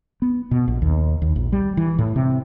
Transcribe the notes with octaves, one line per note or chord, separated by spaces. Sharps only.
B3
B2
A#1
D#2
D#2
A#1
G3
E3
A2
C3